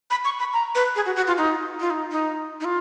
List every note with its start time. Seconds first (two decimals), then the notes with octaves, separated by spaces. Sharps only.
0.11 B5
0.25 C#6
0.39 B5
0.53 A#5
0.75 B4
0.96 G#4
1.06 F#4
1.16 F#4
1.27 F4
1.38 D#4
1.80 F4
1.90 D#4
2.11 D#4
2.60 D#4
2.65 F4